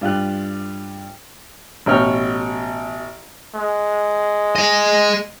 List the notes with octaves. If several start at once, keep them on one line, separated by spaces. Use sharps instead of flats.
G2 F4 G4 F#6
A1 B2 C#5 G5 F6
G#3
G#4 D#5